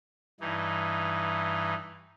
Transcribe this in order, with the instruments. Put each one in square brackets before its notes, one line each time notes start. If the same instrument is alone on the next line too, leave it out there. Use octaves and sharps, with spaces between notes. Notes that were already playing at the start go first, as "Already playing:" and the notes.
[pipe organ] G2 E3 D#4